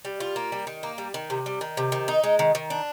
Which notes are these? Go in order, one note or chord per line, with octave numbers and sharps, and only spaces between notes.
G3
F4
A#3
G3
D#3
A#3
G3
D#3
C3
G3
D#3
C3
D#3
D#4
G#3
D#3
D#3
D4